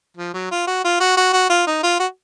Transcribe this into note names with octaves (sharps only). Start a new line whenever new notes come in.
F3
F#3
F4
F#4
F4
F#4
F#4
F#4
F4
D#4
F4
F#4